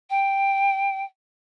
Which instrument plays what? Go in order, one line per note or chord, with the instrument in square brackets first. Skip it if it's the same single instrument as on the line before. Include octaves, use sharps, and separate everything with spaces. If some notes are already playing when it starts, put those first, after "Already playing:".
[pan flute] G5